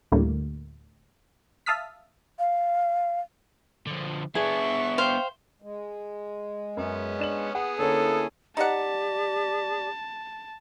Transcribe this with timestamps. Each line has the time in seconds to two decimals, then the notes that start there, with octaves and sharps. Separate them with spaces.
0.12 D2 A2 D3 G3 A3 A#3
1.66 E5 F5 A5 D#6 F6 B6
2.39 F5
3.87 D3 F3
4.35 B3 D4 G#4 E5 C#6
4.98 C5 F5 G5
5.62 G#3
6.77 F#2 B3 C#4
7.19 D4 E7 F#7
7.55 B3 G#4 F#5
7.79 D3 A#3 C#4 E4 A4 C#5
8.57 D#4 G4 D5 F#5 A5